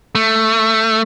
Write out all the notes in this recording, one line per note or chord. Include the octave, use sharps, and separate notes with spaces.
A3